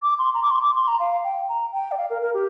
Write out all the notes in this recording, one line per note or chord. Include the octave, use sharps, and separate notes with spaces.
D6
C6
A#5
D6
C6
D6
C6
A#5
F5
G5
A#5
G5
D5
F5
A#4
A#4
G4